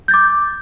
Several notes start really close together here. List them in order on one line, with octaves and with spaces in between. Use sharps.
G6 A6 D6